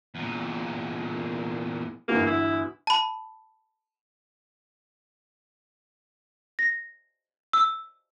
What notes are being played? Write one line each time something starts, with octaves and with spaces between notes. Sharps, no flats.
E2 A#2
G1 E2 A#3 F#4
E4
A5 B5
A#6
E6